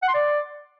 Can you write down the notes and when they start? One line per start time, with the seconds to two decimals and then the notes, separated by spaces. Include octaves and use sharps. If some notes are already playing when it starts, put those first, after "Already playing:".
0.02 F#5
0.08 C6
0.14 D5